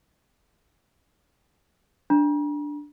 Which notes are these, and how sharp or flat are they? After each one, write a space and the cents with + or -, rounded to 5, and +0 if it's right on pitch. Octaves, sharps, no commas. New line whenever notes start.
D4 +0 A#5 +40